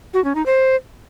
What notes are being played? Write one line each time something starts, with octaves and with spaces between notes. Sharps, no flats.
F#4
C#4
D#4
C5